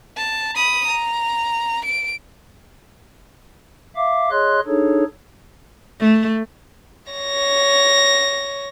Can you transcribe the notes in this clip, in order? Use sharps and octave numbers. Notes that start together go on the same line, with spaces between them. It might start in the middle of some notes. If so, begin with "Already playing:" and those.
A5
B5 D#6
A#5
D7
E5 F5 D6
G#4 C#5 D#5 C6 F#6
D4 D#4 G#4 A4 C#5
A3
C#5 A#6